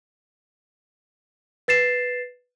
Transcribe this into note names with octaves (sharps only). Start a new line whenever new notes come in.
B4 A6 C7 E7